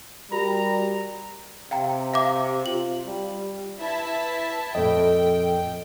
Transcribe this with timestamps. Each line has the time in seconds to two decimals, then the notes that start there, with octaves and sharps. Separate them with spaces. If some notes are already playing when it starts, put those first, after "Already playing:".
0.32 G3 F#4 A#4 A#5 B5
1.71 C3 F5 G5 A#5
2.14 E5 F5 D6
2.66 F4 F#7
3.06 G3
3.80 E4 B4 E5 A5
4.75 F2 A#2 A4 D#5 G5